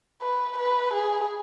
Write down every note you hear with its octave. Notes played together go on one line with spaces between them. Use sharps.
B4
B4
G#4